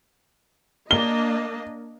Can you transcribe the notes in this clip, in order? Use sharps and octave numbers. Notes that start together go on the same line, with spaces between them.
A#3 D4 D#5 G7